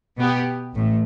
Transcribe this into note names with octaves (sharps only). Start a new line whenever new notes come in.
B2 B3 G4
A1 A2